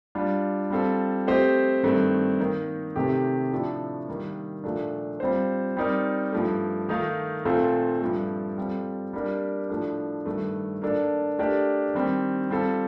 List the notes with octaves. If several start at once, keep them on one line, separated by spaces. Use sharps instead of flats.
G3 D4 F4
G3 C4 F4 A4
A3 C4 G4 C5 D#5
G2 D#3 A3 C4
D#3 A#3 D#4
C3 D#3 A3 C4 G4
A2 F3 A3 D4 A4
D#3 G3 A#3
A#2 F3 A3 D4
G3 C4 F4 C5
G3 C4 D#4 A#4 D5
G2 F3 A3
D#3 A3 D#4 A#4 F5
A#2 A3 C4 F4 A4
G2 F3 A3
G3 C4 F4 A4
G3 A#3 D4 G4 A#4
A2 F3 A3 D4
G2 D#3 A3
A#3 D4 A4 D5
A3 D4 G4 A#4 D5
D#3 G3 C4
G3 C4 F4 A4